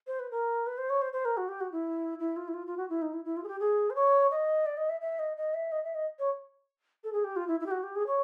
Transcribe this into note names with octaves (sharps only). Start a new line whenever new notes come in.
C5
B4
A#4
B4
C5
C#5
C5
C5
A#4
F#4
G4
F#4
E4
E4
F4
E4
F4
F4
F#4
E4
D#4
E4
E4
F4
G#4
G4
G#4
C5
C#5
D#5
D5
D#5
E5
E5
D#5
D#5
E5
D#5
E5
D#5
C#5
A4
G#4
G4
F4
E4
E4
G4
F#4
G4
G#4
C#5